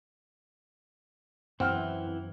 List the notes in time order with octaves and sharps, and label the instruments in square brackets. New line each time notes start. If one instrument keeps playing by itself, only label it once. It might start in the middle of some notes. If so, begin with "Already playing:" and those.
[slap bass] F#2 [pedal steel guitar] E3 E4 [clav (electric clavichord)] C4 [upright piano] F#5 F6